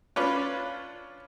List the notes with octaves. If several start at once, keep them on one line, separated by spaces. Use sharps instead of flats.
C#4 D4 F4 B4